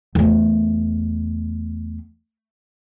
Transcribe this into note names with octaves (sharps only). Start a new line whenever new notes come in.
E2 A3